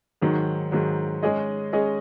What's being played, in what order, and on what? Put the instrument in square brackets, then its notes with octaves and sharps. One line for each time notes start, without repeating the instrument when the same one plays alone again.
[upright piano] G#2 D#3 F#3
G#2 D#3 F#3
G#3 C#4 G#4 D#5
G#3 C#4 G#4 D#5